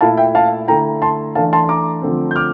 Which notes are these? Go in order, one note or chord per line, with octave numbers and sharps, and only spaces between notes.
A#2 A3 E4 F5 A5
E5 G5
F5 A5
D3 A3 E4 G5 A#5
A5 C6
E3 A3 D4 F5 A5
A5 C6
C6
A#5 D6
D3 F3 A3 C4
G6
D6 F6